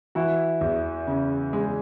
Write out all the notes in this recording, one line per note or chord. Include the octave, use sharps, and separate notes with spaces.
E3 E4 F#4
E2
C#3
G#3